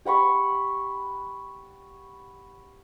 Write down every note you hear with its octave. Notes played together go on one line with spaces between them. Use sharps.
G4 F#5 B5 C#6